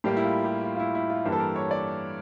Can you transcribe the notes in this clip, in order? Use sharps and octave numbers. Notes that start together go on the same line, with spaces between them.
A2 G3 A#3 G4
E4
F4
G4
F4
F4
E4
E4
F4
G2 E3 A#3 D4 G4
A4
A#4
C#5
D5